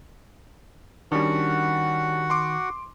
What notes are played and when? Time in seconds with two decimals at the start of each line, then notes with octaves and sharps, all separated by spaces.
1.12 D#3 G3 C#4 D4 F#4 F#5
2.30 C6 D6